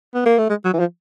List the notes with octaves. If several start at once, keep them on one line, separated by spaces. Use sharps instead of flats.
B3
A#3
A3
G#3
F#3
E3
F3